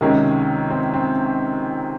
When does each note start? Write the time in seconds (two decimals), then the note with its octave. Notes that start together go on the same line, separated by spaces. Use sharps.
0.01 C#2 C3 D#3 G#3 A#3 C#4
0.70 C4
0.94 C4